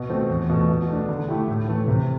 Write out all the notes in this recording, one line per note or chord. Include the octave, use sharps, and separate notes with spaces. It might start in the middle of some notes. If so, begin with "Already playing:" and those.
Already playing: B2
A3 C4 F#4
E2
B2 A3
B2
A3 D4
D3
A3 E4 G4
A2
E3 A3
C3